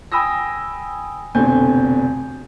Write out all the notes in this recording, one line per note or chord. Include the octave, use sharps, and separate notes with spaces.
G5 G#5 B5 D#6 E6 A#6
F1 B2 D3 C4 G#5 G6